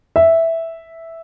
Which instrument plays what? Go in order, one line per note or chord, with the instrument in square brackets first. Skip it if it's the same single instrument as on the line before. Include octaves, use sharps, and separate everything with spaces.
[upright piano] E5